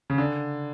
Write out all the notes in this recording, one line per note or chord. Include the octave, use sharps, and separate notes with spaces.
C#3
D3